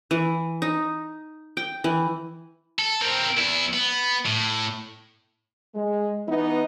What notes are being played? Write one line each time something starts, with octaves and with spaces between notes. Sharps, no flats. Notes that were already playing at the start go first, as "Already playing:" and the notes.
E3
D#4
G5
E3
A4
C4 A#4
E2 E4
B3
A2
G#3
E3 B3 D#4